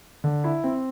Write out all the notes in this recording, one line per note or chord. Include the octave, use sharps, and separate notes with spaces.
D3
E4
C4